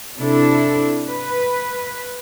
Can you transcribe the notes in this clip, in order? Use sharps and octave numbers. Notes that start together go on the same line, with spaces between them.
C3 D4 E4 A4
B4